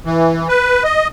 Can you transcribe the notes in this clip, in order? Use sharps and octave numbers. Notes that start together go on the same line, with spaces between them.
E3
B4
D#5